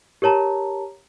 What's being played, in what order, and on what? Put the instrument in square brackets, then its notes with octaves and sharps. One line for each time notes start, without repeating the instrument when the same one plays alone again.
[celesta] G4 A#4 C#5 A5 A#5